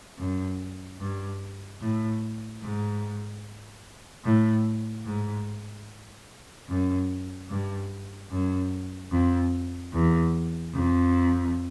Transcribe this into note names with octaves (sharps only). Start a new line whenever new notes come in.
F#2
G2
A2
G#2
A2
G#2
F#2
G2
F#2
F2
E2
F2